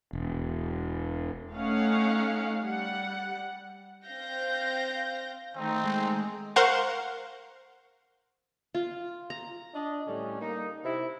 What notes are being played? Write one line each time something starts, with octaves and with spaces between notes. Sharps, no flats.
E1
A3 C#4 D#4 F5 F#5
G3 F#5
C4 F5 G6 A#6
D#3 A3 C4 D#4
G#3
A#4 C5 F5 F#5 C6 C#6
F4
A#5
D4 D#5
A2 D3 G3 C#4
A#3 D#4
C3 E4